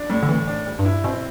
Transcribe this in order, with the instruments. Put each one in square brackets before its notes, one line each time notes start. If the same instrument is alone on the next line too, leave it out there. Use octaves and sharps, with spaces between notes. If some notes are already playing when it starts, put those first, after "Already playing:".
Already playing: [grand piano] D4
[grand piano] A2 [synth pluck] G3
[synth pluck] D3
[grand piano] A2 [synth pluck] E3
[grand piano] D4
G3
[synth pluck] G2
[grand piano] E4
[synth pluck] B2 [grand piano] C4